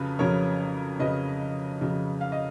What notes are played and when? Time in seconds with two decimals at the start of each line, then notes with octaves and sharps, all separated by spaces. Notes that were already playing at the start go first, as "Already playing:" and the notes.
Already playing: F2 C#3 F#3 B4
0.19 F2 C#3 F#3 A#4 C#5
0.99 F2 C#3 F#3 B4 D#5
1.81 F2 C#3 F#3
2.21 F5
2.32 D#5